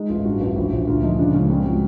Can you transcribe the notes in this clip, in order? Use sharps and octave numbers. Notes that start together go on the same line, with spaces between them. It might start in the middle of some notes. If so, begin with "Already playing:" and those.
Already playing: G#3 D#4
A1 F4
G2 F#4
A1
A#1
A#1
D2 F4
F3 D#4
C#3 D4
C#2 C#4
C#2 C4
F#3